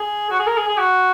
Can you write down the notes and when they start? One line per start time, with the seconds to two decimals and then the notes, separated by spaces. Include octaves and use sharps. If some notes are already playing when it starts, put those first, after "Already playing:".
Already playing: G#4
0.31 F#4
0.39 G#4
0.47 A#4
0.57 G#4
0.68 G#4
0.77 F#4